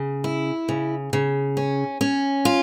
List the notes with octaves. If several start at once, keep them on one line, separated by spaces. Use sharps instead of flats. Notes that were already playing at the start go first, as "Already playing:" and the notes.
Already playing: C#3
E4
C#3
C#3
C#4
C#4
F4